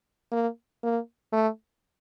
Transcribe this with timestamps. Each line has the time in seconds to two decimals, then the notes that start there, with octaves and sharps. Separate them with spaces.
0.32 A#3
0.83 A#3
1.33 A3